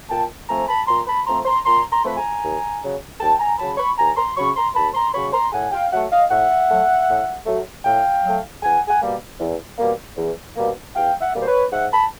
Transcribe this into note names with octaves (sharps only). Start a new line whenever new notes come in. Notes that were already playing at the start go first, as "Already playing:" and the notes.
A#2 G5 A5
F3 A3 C4 G#5 A#5
A5 B5
A#2 A#5 C6
A5 B5
F3 A3 C4 A#5 C6
A#5 C6
A#2 A#5 C6
A#5 C6
F3 A3 C4 B5
G#5 A#5
D#2
C#3 F#3
D#2 G5 A5
G#5 A#5
C#3 F#3 A5 B5
B5 C#6
D#2 G#5 A#5
A#5 C6
C#3 F#3 B5 C#6
A#5 C6
D#2 A5 B5
A#5 C6
C#3 F#3 B5 C#6
A#5 C6
A2 F#5 G#5
F5 G5
F#3 A3 E5 F#5
D#5 F5
A2 E5 F#5
F#3 A3
A2
F#3 A3
A2 F5 G5
F#3 A3
E2 F#5 G#5
F#5 G#5
B2 G3 A#3
E2
B2 G3 A#3
E2
B2 G3 A#3
E2 F5 G5
E5 F#5
B2 G3 A#3
C5
B4 C#5
G#2 E5 F#5
A5 B5